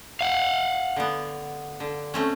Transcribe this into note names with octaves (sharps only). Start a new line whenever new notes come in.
F5 F#5
D3 B3
D3
A3 C4 C#4